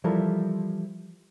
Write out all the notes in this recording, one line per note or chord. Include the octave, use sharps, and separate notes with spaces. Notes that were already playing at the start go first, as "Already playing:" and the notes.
E3 F3 G3 E4 A4 A#4